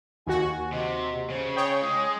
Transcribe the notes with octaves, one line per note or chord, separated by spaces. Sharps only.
D#2 F#4 G#5
C3 D#5
C#3 C5
C#5 G5 D#6
G#3